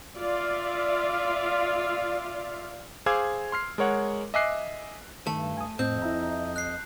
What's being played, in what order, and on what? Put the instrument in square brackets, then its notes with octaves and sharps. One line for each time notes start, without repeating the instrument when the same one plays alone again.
[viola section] F4 D5 E5 F5
[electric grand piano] G#4 C5 F5 D6 E6 G#6
C6 F6 C7
G#3 A#4 C#5 F#5
D#5 E5 G#5 D6 F#6 C7
[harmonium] G2 [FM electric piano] D#3 [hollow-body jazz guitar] A3 [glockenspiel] A5
[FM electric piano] G#5 D#6
[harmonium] F2 D#5 [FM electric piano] A2 [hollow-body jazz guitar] C4 [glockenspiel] G6
[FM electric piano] E4 E5 A#5
[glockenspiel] F#6 C7